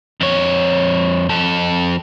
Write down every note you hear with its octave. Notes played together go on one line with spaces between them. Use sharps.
F2 C#5
F2 A4